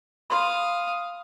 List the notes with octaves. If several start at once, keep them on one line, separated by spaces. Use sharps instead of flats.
F5 B5 C6 D#6